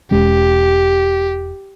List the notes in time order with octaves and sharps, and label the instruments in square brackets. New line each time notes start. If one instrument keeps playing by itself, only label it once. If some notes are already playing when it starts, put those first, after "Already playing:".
[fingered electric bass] E1 G#3 C#4 [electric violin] G4